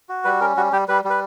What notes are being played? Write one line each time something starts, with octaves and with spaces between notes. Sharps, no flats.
F#4
G3 B4
C#4 A#4
G3 F#4
G3 G4
G3 B4
G3
B4